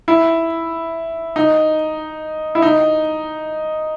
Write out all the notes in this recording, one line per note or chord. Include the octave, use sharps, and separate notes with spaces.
E4
D#4
E4
D#4